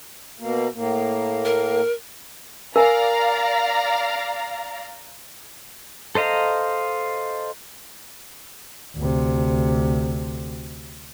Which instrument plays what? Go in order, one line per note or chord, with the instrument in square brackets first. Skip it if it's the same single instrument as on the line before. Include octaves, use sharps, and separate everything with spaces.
[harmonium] B2 A#3
A2 A#3
[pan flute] A#4
[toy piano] A#4 G#5 [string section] D5 F5 A#5
[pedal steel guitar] A4 C5 D#5 F5 A#5
[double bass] D2 C3